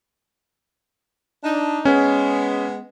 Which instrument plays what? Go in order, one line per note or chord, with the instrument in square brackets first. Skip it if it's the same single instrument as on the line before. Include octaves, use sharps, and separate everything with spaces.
[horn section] D4 D#4
[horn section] G#3 B3 [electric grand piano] C#4